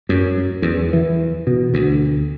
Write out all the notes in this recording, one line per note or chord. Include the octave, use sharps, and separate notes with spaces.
F#2
E2
E3
B2
D2